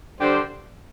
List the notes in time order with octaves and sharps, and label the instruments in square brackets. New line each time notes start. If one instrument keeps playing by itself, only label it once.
[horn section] D3 G3 D4 G4 C5